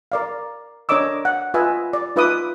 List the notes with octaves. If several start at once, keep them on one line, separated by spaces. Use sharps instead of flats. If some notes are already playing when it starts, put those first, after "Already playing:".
A#4 D5 F5
D4 A#4 C#5 D#5 D6 E6
F#5
F4 B4 D#5 E5 G#5
D5
D#4 F4 B4 E5 D6 D#6